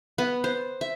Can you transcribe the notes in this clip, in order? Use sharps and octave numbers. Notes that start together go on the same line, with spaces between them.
B3
C5
E5